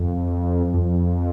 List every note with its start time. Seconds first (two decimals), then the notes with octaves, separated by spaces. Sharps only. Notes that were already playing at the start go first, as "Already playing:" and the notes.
Already playing: F2
0.74 F2